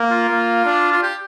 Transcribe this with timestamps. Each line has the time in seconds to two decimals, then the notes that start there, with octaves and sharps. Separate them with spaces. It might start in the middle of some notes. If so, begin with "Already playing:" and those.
Already playing: A#3
0.11 F4
0.30 A#3
0.65 D4
0.92 F4
1.03 G4